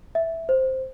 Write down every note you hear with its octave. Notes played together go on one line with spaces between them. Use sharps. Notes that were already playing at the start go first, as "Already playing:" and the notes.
E5
C5